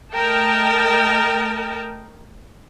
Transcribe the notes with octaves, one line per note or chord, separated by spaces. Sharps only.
A3 A#4 D#5 G5 A5